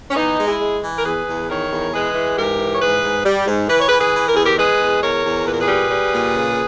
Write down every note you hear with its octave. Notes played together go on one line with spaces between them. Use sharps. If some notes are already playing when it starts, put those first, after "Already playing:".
C#4
E3 B3 D#4
G#3
E4 G#4
G#3
E3
A#4
E2 G#4 B4
E2
D#3 A#4 C#5
E2
G#3 G#4 B4
E3
G#2 G4 A#4
E3
C#5
G#2 G#4 B4
G#2
G3
G#2
E3 B4
C#5
G#4 B4
E3
G#4 B4
E3
A#4
E2 G#4
G4 A#4
G#3 G#4 B4
E2
E2 A#4 C#5
E2
A#2 B4
A#4
G#4 B4
G3
G3
A#2
C#3